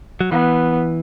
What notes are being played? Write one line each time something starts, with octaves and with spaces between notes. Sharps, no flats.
F#3
E3 B3